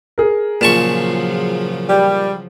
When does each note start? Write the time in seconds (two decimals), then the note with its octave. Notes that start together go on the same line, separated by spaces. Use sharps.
0.18 G#4 A#4
0.61 A#2 C#3 F3 F#3 A5 C#6
1.89 G3